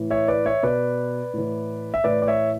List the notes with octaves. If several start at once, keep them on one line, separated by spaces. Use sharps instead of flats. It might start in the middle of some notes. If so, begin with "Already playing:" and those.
Already playing: A2 E3
C#5 E5
B4 D5
C#5 E5
B2 B4 D5
A2 E3
E5
A2 E3 B4 D5
D5
C#5 E5